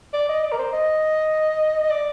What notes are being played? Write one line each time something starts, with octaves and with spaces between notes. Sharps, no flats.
D5
D#5
D5
A#4
C5
D#5
D#5
D5